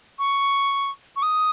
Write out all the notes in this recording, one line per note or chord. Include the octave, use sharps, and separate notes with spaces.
C#6
C#6
D#6